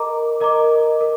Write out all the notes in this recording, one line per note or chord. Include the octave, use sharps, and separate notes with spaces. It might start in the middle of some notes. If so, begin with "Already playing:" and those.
Already playing: A#4 D#5 A#5 D6
A#4 D#5 A#5 D6
A#4